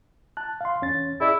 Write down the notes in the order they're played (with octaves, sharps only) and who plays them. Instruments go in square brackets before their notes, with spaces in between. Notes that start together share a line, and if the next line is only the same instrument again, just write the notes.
[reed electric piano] A5 F#6
F5 C6
E2 C#4 A6
[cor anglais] E4 [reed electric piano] G#4 D5